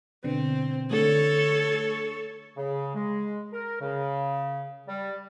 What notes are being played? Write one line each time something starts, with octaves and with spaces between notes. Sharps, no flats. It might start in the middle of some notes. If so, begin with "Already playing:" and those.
B2 D3 C4
D3 A3 A4 C#5
C#3
G#3
A#4
C#3
G3